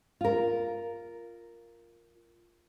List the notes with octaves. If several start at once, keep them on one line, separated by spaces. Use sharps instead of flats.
F4 A#4